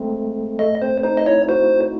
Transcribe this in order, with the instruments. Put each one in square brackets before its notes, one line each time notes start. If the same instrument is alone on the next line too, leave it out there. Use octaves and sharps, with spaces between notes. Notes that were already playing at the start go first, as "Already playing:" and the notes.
Already playing: [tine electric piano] G#3 A3 C4
[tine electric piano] A3 [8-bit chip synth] D#5
[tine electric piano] C4 [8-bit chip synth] C5
[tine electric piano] D#4 [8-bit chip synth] C5
[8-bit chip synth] D#5
[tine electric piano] E4 [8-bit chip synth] C#5
[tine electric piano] F#4 [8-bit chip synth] C5